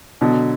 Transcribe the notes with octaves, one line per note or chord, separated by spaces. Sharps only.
B2 D3 F#3